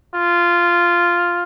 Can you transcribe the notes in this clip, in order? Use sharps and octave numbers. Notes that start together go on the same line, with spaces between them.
F4